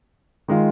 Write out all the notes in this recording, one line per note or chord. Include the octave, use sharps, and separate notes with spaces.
D#3 G#3 F4